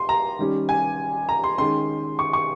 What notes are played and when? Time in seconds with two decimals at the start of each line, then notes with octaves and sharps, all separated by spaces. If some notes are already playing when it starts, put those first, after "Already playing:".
Already playing: C6
0.09 A#5
0.39 D#3 G3 C#4
0.69 G#5
1.29 A#5
1.44 C6
1.58 D#3 G#3 C#4 C6
2.19 C#6
2.33 C#6